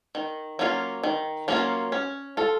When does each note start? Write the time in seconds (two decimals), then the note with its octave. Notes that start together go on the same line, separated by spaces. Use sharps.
0.15 D#3
0.59 F#3 A#3 C#4 F4
1.03 D#3
1.48 F#3 A#3 C#4 F4
1.92 C#4
2.37 F4 A4